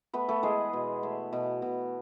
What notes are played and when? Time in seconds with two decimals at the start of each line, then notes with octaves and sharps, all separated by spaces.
0.13 A3 B3 B4
0.29 A3 A4
0.43 E3 G#3 G#4
0.73 B2
1.03 A3
1.33 B2
1.62 B2